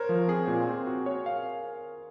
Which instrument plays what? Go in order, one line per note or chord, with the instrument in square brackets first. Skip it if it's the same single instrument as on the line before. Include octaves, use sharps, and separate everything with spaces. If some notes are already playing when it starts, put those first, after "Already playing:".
Already playing: [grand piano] A#4 C5 C#5
[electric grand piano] F3
[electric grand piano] C4 [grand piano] G#4
[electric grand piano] A#2
C4
F#4
C#5
F5